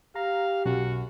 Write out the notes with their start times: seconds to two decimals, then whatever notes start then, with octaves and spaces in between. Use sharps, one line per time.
0.15 G4 F5 A#5
0.65 B1 F#2 F#4